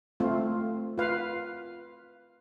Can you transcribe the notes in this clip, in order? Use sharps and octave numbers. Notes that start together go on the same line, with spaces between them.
A3 C4 F4
F4 B4 F5